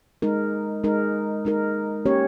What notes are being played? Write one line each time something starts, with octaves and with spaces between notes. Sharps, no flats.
G#3 D#4 A#4
G#3 D#4 A#4
G#3 D#4 A#4
A#3 C#4 G4 C#5